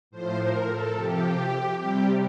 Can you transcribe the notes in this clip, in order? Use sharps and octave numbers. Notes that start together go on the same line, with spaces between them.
A2 F3 C5
A#4
A4
C3 F3 G4
C3 G3 G4